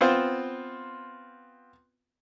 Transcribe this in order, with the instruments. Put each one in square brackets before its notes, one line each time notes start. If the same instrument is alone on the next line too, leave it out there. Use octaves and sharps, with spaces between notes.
[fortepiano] B3 C4 F4 C5